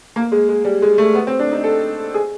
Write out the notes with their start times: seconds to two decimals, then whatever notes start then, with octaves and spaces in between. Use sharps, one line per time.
0.16 A#3
0.32 G#3
0.49 G#3
0.65 G3
0.82 G#3
0.98 A3
1.15 B3
1.27 C4
1.39 D4
1.52 D#4
1.64 A4
2.14 G#4